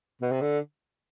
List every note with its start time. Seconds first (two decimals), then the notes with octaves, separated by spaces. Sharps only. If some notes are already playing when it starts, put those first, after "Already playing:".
0.22 B2
0.32 C3
0.41 D3